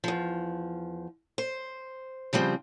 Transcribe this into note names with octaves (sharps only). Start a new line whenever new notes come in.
E2 F3
C5
C#3 F3 G3 C4